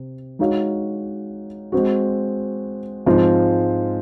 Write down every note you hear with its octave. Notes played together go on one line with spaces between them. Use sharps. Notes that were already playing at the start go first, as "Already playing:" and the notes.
Already playing: C3
G#3 D#4 F#4 C#5 F5
G#3 C4 F#4
G#2 F3 G#3 C4 F4